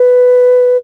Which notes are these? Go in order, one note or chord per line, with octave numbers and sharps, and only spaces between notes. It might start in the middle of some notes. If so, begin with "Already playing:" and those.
Already playing: B4